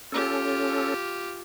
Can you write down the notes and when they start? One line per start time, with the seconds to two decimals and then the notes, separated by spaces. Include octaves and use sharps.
0.12 C#4 F4 G4 A4